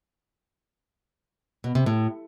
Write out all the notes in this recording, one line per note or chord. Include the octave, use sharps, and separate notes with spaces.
B2
C3
A2